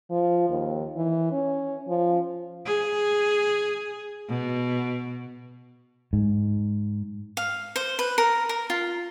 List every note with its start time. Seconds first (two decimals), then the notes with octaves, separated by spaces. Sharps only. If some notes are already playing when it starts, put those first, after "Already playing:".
0.10 F3
0.49 D#2
0.97 E3
1.32 C#4
1.88 F3
2.65 G#4
4.29 B2
6.13 G#2
7.37 F5
7.76 C5
7.99 B4
8.18 A#4
8.49 A#4
8.70 F4